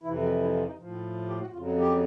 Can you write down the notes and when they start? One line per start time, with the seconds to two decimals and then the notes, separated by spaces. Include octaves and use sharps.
0.03 F2 C3 E3 E4
0.22 F#4
0.42 E4
0.53 F4
0.66 D#4
0.79 A2 F3
1.28 G4
1.41 F#4
1.53 F2 F4
1.56 C#3 F#3
1.66 F#4
1.78 G4